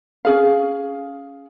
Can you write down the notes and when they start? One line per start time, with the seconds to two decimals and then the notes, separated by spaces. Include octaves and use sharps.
0.25 C#4 G#4 F5